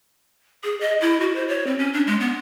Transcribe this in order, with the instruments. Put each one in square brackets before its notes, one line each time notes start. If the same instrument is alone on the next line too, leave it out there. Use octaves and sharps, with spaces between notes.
[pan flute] G#4
D#5
E4
F#4
C5
C#5
C4
C#4
D4
G#3
B3